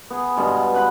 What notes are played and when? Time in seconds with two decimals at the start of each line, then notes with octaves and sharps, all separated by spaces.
0.10 B3 G#4
0.36 G2 B2 G#3 F4
0.74 B4 F#5 B5